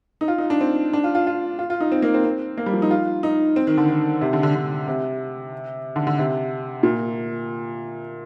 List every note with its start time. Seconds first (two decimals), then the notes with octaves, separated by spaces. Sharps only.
0.21 D#4
0.28 F4
0.38 D#4
0.50 D4
0.61 C4
0.93 D4
1.04 F4
1.15 F4
1.27 F4
1.59 F4
1.70 F4
1.80 D#4
1.92 C4
2.02 A#3
2.14 C4
2.24 C4
2.58 A#3
2.66 G3
2.73 F3
2.82 D#4
2.91 F4
3.23 D#4
3.56 C4
3.67 D#3
3.77 D3
3.89 D#3
4.21 C3
4.33 D3
4.43 D3
4.55 D3
4.88 C3
5.96 D3
6.07 D3
6.18 C3
6.83 A#2